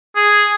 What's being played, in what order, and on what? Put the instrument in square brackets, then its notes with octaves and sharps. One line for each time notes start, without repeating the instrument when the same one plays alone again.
[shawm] G#4